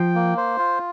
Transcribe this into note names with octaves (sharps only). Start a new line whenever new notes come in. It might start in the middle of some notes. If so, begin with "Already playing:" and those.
Already playing: F3 G5
A#3
C5
F4